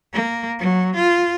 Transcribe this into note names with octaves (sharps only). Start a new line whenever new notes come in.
A#3
F#3
F4